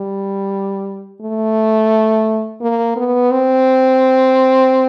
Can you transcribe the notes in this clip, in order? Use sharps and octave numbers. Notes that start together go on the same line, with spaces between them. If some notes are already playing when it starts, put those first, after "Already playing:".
Already playing: G3
A3
A#3
B3
C4